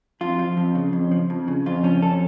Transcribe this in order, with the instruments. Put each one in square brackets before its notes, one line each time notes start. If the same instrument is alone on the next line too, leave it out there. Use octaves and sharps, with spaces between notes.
[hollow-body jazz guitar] F2 F4
F3
F2
C#3
F2
F3
F2
C#3
F2 F4
F3 C#4
F2 A4